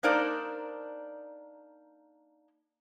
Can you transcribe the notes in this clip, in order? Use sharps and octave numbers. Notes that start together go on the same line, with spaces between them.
A#3 D4 D#4 A#4 C5 D5